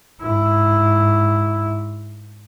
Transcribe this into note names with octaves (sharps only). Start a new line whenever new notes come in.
G#2 E4